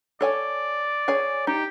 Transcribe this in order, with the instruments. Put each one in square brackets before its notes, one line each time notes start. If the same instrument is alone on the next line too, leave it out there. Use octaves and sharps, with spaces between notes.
[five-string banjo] A4 C#5 G#5 [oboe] D5
[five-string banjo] G#4 C#5 G#5
[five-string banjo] D#4 [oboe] G4